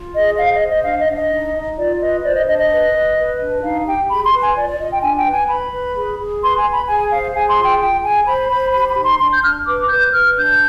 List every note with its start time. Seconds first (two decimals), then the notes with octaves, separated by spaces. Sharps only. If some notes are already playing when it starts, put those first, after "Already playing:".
Already playing: F4
0.15 G#4 D#5
0.38 C5 F5
0.54 D#5
0.62 C5
0.70 D#5
0.84 D4 F5
1.00 D#5
1.08 D4 F5
1.15 D#5
1.31 D#4
1.55 D#4
1.77 F4 D5
2.00 B4 D#5
2.23 C5 D5
2.35 D#5
2.47 D4 D#5
2.59 D#5
2.70 B4
2.94 B4
3.17 B4
3.40 D4
3.63 D#4 F5
3.86 G4 G5
4.10 G#4 B5
4.25 C6
4.33 B4
4.41 G#5
4.56 F4 D5
4.68 D5
4.79 F4 D#5
4.91 G5
5.02 D4 G#5
5.18 G5
5.26 B4
5.33 G#5
5.49 B4 B5
5.72 B4
5.95 G#4
6.18 G#4
6.42 B4 C6
6.58 G#5
6.64 B4
6.72 B5
6.88 G#4 G#5
7.11 C5 F5
7.34 G#4 G#5
7.50 C6
7.58 F4
7.65 G5
7.81 F4 G5
8.04 G#4 G#5
8.27 C5 B5
8.50 C5 B5
8.73 G4 B5
8.89 B5
8.97 D#4
9.04 C6
9.20 D4 C6
9.32 G6
9.43 D4 F6
9.67 B4 D6
9.89 B4 G6
10.13 B4 F6
10.36 D4 G6